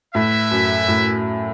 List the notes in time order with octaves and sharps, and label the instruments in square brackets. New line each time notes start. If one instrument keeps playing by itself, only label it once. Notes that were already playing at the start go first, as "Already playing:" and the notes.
[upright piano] A2 [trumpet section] E4 B4 E5
[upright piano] F#2
A2